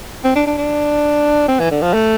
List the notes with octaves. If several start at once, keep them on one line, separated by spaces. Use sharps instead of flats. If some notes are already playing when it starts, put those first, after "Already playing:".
C4
D4
D4
D4
C4
E3
D3
F3
A3